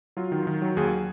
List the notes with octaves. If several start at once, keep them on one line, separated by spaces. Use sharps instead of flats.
F#3 F4
D#3
D#3
F#3
D#2 G#4